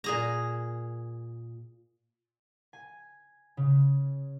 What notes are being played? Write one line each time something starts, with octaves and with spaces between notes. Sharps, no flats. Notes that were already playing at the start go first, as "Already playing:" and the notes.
A#2 G#4 A#5
G#5
C#3